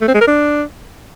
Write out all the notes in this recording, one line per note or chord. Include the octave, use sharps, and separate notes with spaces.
A3
C4
G#3
A#4
D4